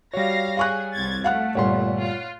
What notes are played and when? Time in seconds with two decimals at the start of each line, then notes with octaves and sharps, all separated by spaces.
0.14 G3 F#4 C#5 F5 A#6
0.57 G#4 F5 C#6 F#6
0.93 C2 G#6 A6
1.24 A3 F5 F#5 F#6
1.55 G1 A#2 G3 C#5 F#5 C6
2.00 F4